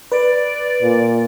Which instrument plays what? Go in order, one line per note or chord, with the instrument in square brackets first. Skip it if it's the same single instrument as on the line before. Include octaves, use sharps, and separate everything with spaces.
[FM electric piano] B4 [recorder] D5
[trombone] A#2